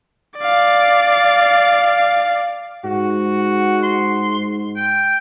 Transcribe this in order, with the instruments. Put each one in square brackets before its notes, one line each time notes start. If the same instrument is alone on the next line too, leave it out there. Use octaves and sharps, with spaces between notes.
[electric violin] D5 F5
[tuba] G#2 [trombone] F#4
[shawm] C6
G5